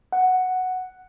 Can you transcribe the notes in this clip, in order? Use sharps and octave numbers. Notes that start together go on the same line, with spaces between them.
F#5